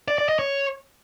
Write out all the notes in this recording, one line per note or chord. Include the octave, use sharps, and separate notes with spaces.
D5
D5
D#5
C#5